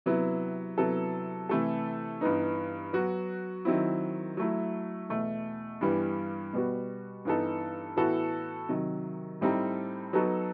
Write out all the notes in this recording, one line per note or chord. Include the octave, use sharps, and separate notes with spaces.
C3 F#3 B3 E4
C3 F#3 B3 E4 A4
C3 E3 A3 E4 A4
G2 E3 B3 D#4
F#3 B3 F#4
D#3 F#3 C4 E4
F#3 A3 E4
E2 B2 A3
G2 E3 G3 B3
B2 G3 B3 F#4
G2 E3 B3 D#4 A4
A2 E3 B3 F#4 A4
C3 D#3 F#3
A2 G3 C4 D#4 A4
F#3 B3 D#4 F#4 A4